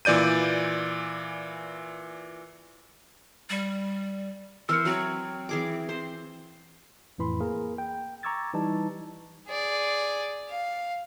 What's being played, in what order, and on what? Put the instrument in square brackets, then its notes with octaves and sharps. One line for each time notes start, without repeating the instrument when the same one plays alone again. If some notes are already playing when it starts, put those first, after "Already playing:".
[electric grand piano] A#2 E3 D5 G6 D#7
[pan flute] G3
[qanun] E3 C5 [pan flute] A#4 [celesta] E6 F6 C#7
[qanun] F#3 C#5 [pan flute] C4
[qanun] E3 G#4 D6
C5
[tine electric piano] F2 A2 E3 B5 C6
A#3 G#4 A#4
G5
A#5 C#6 D6 E6 G#6 A6
E3 G3 D#4 A5
[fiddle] G#4 D5
F5